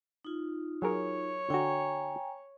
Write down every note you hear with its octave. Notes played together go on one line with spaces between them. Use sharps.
D#4 F4
F#3 G#4 A#4 C#5
D3 F#4 G5 G#5 A#5